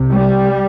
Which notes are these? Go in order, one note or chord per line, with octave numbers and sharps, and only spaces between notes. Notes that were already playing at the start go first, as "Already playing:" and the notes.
Already playing: C2 C3
G3